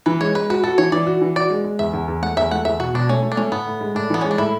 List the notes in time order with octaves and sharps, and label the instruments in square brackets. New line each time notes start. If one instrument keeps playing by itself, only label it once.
[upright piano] E3 [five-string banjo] B4
[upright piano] G#3 [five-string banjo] C#5
[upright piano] G#3 [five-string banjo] B4
[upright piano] F#4 [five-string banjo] B4
[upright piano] F#4 [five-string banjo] A4
[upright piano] E3 [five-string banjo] C#5
[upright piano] E3 [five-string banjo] D5
[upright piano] F#4
E3
[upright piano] F#4 [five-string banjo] D5
[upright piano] G#3
G#3
[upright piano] E2 [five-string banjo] E5
[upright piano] E2
E2
[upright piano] A3 [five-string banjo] F#5
[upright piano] E2 [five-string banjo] E5
[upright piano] A3 [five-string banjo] F#5
[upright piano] E2 [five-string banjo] E5
[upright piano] B2 [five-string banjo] F#4
[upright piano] B2 [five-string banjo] D4
[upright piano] A3 [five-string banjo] C#4
[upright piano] A3
[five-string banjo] D4
[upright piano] A3 [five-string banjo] C#4
[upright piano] A2 [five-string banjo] B3
[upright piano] A2
G#3
[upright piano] A2 [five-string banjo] D4
[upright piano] E3 [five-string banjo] B3
[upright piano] G#3 [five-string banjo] C#4
[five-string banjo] D4
[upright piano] A2 [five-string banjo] E4